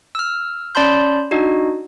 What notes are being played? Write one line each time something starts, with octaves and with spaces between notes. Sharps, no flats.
E6 F6
C#4 D5 A5 B5 C6 G6
D4 D#4 F#4 D#5